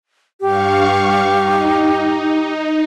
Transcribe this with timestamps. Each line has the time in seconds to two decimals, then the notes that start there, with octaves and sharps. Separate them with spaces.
0.41 G2 G4 F5 C#6
1.36 D#4